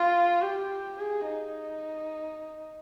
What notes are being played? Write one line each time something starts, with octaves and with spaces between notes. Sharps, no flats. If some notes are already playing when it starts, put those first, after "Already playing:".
Already playing: F4
G4
G#4
D#4